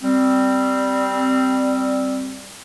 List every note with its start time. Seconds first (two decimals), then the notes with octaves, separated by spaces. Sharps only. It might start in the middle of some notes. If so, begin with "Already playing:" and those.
0.02 G3 C4